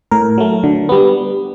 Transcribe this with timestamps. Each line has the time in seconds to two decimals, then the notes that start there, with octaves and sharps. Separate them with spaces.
0.11 A2 A#4
0.38 F#3 A3
0.64 D3
0.89 G3 B3